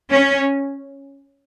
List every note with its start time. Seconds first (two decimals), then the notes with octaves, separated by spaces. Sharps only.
0.11 C#4